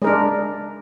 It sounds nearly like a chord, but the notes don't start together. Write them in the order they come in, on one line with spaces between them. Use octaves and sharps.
G#3 A#4 D4